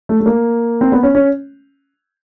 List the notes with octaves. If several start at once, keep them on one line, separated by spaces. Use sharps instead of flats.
A3
A3
A#3
C4
B3
C#4
C#4